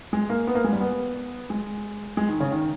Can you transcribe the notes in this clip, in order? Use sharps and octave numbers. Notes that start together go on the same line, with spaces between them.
G#3
A#3
B3
A#3
G#3
G3
B3
G#3
G#3
D#3
C#3
D#3